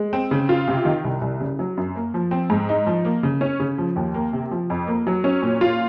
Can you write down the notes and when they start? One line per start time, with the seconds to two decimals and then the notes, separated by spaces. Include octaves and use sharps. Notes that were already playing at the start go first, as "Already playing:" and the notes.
Already playing: G#3
0.13 C4
0.31 C#3
0.49 F4
0.68 C3
0.85 D#3
1.04 C2
1.21 C2
1.40 C#3
1.59 F#3
1.77 F#2
1.96 A#3
2.14 F3
2.31 C4
2.50 G#2
2.69 D#4
2.87 F3
3.05 A#3
3.23 C#3
3.41 C#4
3.60 C#3
3.78 F3
3.96 D#2
4.14 A#3
4.33 C3
4.51 F3
4.70 F2
4.87 A#3
5.07 F#3
5.24 C#4
5.42 A#2
5.61 F4